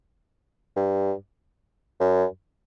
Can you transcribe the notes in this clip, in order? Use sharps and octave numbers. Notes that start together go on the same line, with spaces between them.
G2
F#2